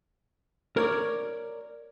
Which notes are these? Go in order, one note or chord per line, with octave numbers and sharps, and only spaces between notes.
A#4 C#5 D5